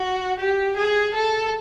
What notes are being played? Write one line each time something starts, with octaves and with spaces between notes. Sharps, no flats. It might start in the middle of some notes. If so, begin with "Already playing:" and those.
Already playing: F#4
G4
G#4
A4